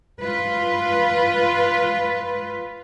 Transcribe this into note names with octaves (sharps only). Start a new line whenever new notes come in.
F4 B4